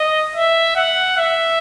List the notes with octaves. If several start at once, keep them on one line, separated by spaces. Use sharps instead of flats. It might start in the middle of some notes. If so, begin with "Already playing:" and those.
Already playing: D#5
E5
F#5
E5